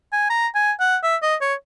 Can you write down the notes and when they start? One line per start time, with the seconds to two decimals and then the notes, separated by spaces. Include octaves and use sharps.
0.13 G#5
0.30 A#5
0.55 G#5
0.80 F#5
1.03 E5
1.22 D#5
1.41 C#5